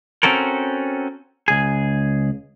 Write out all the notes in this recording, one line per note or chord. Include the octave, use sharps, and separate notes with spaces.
C4 C#4 F#4 A4 A#4
C#2 G#4